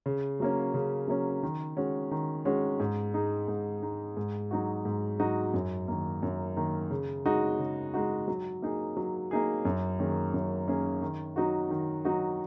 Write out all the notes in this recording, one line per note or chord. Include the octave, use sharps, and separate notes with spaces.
C#3
F#3 A#3 C#4
C#3
F#3 A#3 C#4
D#3
G#3 C#4 F#4
D#3
G#3 C#4 F#4
G#2
G#3 D#4
G#2
G#3 D#4
G#2
F#3 D#4 F#4
G#2
F#3 D#4 F#4
F#2
D#3 A#3
F#2
D#3 A#3
C#3
G#3 D#4 F#4
C#3
G#3 D#4 F#4
F#3
A#3 D#4 G#4
F#3
A#3 D#4 G#4
F#2
D#3 A#3 C#4 G#4
F#2
D#3 A#3 C#4 G#4
D#3
F#3 D#4 F#4
D#3
F#3 D#4 F#4